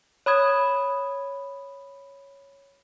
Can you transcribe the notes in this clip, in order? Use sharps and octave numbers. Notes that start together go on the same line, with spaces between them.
C#5 B5 D#6 G#6